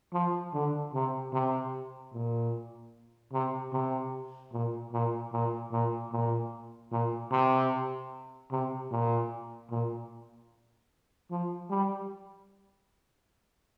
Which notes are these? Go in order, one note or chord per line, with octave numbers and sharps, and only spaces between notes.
F3
D3
C3
C3
A#2
C3
C3
A#2
A#2
A#2
A#2
A#2
A#2
C3
C3
A#2
A#2
F3
G3